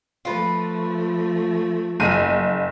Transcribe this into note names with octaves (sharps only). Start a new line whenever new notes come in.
F3 A3 F4 B4
F#1 D#7